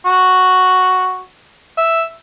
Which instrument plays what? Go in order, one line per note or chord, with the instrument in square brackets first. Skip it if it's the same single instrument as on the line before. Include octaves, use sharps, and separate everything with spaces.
[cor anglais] F#4
E5